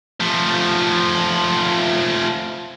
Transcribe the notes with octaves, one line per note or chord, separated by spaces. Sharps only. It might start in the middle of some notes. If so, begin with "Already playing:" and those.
F3 A3